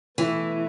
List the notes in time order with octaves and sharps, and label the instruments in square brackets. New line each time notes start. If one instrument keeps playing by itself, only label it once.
[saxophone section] B2 A3 E4 B4 [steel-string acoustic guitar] E3